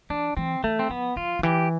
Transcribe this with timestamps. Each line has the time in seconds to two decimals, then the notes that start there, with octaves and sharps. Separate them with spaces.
0.10 E3 D4
0.37 E3 C4
0.64 E3 A3
0.79 C4
0.90 F3 B3
1.16 F3 F4
1.39 D3
1.43 E3 G4